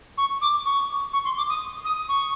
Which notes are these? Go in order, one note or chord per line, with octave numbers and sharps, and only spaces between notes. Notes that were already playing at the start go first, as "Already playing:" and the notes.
C#6
D6
C#6
C#6
C6
D6
D#6
D#6
C#6